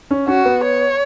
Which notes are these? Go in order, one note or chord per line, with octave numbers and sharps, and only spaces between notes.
C#4
C#4 F#4
B3
C#5